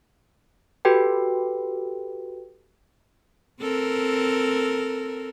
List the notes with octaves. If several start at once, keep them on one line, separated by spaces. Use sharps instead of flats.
F#4 G4 A4 B4 G5
C4 A4 A#4